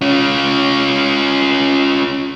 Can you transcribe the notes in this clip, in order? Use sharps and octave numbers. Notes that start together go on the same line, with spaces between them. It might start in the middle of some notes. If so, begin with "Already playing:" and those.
C#4 F4